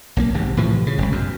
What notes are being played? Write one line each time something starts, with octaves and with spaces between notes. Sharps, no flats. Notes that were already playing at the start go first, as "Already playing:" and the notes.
B1 E3 A#3
G#1 G#2 C3
A2 C3 E3 F3
C#3
F#1 C#2
F#2 B2